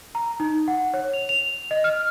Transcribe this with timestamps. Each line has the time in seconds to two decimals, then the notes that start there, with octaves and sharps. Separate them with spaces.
0.15 A#5
0.40 D#4
0.68 F#5
0.94 C#5
1.13 F7
1.29 F7
1.71 D#5
1.84 F6